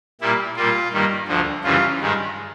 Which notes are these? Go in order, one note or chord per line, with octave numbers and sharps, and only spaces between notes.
A#2 G3 A#3 E4
A#2 G3 A#3 F4
G2 D#3 G3 A#3
D2 D3 F3
F#2 C#3 E3 G3 F4
G2 D#3 G#3